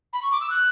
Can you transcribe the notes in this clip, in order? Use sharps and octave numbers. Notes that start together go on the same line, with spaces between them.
B5
C#6
D6
E6
F#6